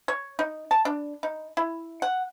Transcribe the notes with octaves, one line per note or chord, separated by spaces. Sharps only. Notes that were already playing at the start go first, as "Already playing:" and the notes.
C#5
D#4
A5
D4
D#4
E4
F#5